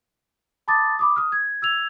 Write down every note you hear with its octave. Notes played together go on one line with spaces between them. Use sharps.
A5 B5 D6 D#6 A6
B5 D6 D#6
D#6 F6
G#6
E6 G#6 F7